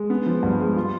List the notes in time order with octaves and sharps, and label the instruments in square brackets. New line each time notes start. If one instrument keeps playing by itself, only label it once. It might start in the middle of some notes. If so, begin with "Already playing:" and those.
Already playing: [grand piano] G#3
B3
F3
G2
G#3
F4